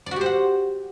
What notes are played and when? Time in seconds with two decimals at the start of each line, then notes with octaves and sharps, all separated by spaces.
0.06 D5
0.11 F#4
0.16 G4
0.21 C5
0.26 F#5